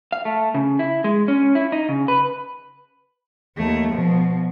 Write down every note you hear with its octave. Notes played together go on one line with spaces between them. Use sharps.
F5
A3
C#3
E4
G#3
C#4
E4
D#4
C#3
B4
D#2 A3
B2 F3